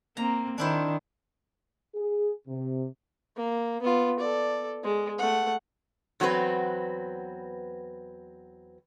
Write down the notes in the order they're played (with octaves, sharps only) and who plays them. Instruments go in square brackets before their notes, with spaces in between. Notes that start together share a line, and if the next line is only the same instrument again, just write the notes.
[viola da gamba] A#3 C4 [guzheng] A#5
[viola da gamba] D#3 [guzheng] D4 E4 C5
[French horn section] G#4
C3
[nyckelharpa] A#3
B3 F4
A4 D5
G#3
A3 F#5
[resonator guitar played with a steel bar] E2 F#3 B3 C4 B4